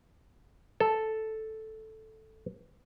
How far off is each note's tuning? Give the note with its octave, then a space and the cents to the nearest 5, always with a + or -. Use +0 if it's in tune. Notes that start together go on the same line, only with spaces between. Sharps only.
A4 -5